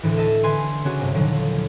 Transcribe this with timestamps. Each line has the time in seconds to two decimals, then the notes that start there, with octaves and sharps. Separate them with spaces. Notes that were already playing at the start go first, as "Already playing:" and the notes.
0.03 D2 A2 E3
0.17 A4 D#5 E5 A5
0.43 D3 E4 B4 G#5 C6 D#7
0.84 C#3 C#4 D4 F#4 G#4
1.01 G1 G2 C3
1.13 D#2 A#2 D3 F3 F#3